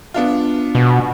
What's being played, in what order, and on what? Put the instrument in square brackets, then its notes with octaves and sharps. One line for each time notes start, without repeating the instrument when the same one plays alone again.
[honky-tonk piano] B3 D4 F4
[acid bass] B2